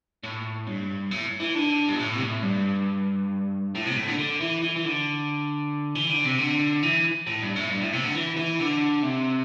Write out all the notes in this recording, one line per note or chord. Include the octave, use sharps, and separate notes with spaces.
A2
G2
A2
E3
D3
G2
A2
C3
A2
G2
A2
C3
A2
D3
D3
E3
E3
E3
D3
E3
D3
C3
D3
E3
A2
G2
A2
G2
A2
C3
D3
E3
E3
D3
C3